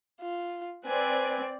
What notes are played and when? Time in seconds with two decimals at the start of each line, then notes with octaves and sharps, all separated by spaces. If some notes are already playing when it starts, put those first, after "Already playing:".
0.21 F4
0.86 C4 B4 D5 G#5